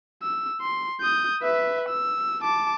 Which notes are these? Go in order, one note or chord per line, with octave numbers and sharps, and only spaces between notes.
E6
C6
D#6 G6
B4 E5
E6
A5 D6